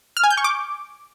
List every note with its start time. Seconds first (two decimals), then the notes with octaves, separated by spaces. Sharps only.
0.17 F6
0.24 G#5
0.30 G6
0.37 C#6
0.44 D6